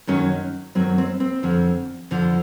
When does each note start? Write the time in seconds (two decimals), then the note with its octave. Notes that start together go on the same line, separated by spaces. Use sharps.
0.07 F#2 D#3 F#3 C#4
0.75 F#2 D#3 F#3 C4
0.98 C4
1.20 C4
1.43 F2 D3 F3
2.11 F2 D3 F3